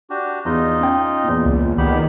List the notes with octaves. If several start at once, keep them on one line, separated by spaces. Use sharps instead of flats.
D4 F#4 G4
E2 D#4 F4 D#5
C#4 G5
E2 A#2
C#2
D#3 B3 G4 B5